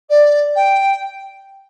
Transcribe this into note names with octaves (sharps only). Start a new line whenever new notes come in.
D5
G5